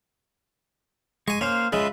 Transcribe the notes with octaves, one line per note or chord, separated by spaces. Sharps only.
G#3 G#5 C#6
A#3 C#4 C5 F5
C#3 G#3 F4 B4 E5